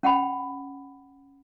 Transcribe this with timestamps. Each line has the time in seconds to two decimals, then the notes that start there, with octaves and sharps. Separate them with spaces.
0.03 C#4 F#5 G5 B5